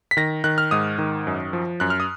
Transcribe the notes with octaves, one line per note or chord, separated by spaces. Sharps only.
B6
D#3 A#6
D#3 F#6
F6
G#2 D#6
D#3
F#2
F3
F#2 F#6
F6
D#6